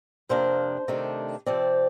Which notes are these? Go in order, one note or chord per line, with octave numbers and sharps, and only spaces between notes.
F2 C3 F3 A#3 D4 C5
C3 D#3 A3 D4
C3 F3 C4 D5